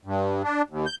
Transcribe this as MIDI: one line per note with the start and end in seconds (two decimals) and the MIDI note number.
0.05 0.42 43
0.44 0.62 62
0.70 0.86 39
0.86 0.95 91